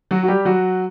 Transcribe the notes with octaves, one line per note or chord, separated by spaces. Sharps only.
F#3 F#4
F#4
G3 G4
F#3 F#4